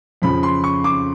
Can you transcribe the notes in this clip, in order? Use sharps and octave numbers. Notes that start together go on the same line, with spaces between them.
F2 C#3 F3 B5
C6
C#6
D6